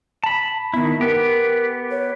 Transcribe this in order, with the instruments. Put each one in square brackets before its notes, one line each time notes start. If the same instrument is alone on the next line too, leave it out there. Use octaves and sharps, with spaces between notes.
[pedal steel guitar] A5 B5
[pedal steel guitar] D#3 E4 [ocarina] B3
[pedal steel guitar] B3 G4 [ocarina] A#4
[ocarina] C#5